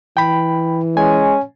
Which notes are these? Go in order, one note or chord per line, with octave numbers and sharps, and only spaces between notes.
E3 G5 B5
G#3 C#4 G#5